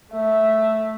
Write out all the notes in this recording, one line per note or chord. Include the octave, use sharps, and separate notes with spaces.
A3 E5